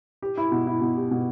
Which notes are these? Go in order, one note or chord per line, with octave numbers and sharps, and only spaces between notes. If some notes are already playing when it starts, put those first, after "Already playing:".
G4
E4
B2
E4
B2
G4
B2